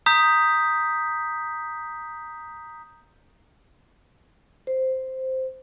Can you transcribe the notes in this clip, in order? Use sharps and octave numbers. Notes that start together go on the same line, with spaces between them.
A#5 D#6 G6 B6
C5